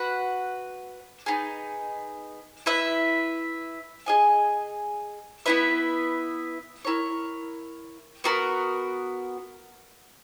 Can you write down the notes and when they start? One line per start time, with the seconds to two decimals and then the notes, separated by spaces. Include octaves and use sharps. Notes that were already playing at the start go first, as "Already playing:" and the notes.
Already playing: F#4 B4 F#5
1.26 B3 D#4 G#4
2.66 E4 B4 E5
4.06 G#4 D#5 G#5
5.46 B3 E4 B4 E5
6.85 E4 A#4 C#5
8.24 B3 F#4 A#4